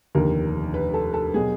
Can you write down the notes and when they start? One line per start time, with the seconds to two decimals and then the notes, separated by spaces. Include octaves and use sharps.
0.15 F1 D#2 D3 A#4
0.74 B4
0.94 A4
1.13 A4
1.34 B2 F#3 G#4